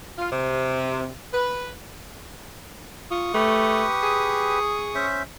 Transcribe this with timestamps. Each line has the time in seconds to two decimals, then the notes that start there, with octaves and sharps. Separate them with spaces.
0.18 F4
0.32 C3
1.33 B4
3.11 F4 C#6 D#6
3.34 A3 G4 B4
4.03 G#4
4.95 C#4 C5 E5